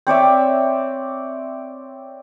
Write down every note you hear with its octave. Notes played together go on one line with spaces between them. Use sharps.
C4 C#5 D5 E5